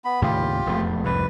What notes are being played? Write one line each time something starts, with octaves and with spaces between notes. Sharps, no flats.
B3 B5
D#2 A2 C#3 F4 G4
E1 F2 A3
C2 F2 G#2 B4